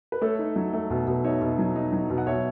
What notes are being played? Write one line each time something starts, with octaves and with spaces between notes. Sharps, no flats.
B4
A3 A4 C#5
D#4
F#3
A3
B2
B2
D#4 C#5 E5
B2
F#3
D#4
F#3
B2
F#5
B2 C#5 E5